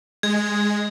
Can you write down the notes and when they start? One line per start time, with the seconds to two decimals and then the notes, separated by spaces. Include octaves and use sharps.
0.23 G#3 G#6